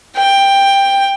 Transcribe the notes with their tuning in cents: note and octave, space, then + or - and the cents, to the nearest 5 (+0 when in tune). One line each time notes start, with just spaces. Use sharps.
G5 +10